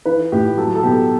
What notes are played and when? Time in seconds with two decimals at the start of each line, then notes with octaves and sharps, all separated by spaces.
0.05 E3 B4
0.32 A2 G4
0.57 F#3 A4
0.75 A4
0.83 B2 G4